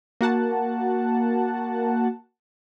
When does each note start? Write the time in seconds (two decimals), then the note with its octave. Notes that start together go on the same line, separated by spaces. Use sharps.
0.21 A#3 F#4 F#5 A5